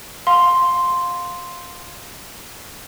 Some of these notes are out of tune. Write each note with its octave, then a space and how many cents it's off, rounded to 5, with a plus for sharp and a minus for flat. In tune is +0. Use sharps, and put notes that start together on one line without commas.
F5 +20 C6 +0